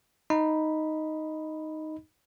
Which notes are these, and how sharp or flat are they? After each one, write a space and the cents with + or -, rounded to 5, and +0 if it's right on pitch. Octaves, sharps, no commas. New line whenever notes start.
D#4 +0 D#5 +0 B5 +0